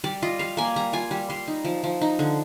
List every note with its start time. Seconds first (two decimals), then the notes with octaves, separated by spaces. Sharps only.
0.04 G3 D5
0.22 F4 D#5
0.39 G3 F5
0.57 A#3 G#5
0.76 G3 A#5
0.93 F4 G#5
1.11 G3
1.30 G3 C6
1.48 D#4
1.65 F3
1.84 F3
2.01 D#4
2.19 D3